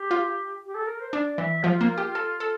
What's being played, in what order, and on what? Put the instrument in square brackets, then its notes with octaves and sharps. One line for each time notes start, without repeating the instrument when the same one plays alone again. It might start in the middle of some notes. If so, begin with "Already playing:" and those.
Already playing: [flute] G4
[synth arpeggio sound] F4
[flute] G4
A4
A#4
C5
[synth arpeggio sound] D4 [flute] D5
[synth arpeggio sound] E3 [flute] E5
[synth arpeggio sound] F3 [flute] F4
[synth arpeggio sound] A#3
G4
A4
A4